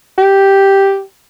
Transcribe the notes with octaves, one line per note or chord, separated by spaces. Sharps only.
G4